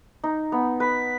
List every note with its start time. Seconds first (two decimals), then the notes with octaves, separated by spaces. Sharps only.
0.24 D#4
0.52 B3
0.80 B4 B6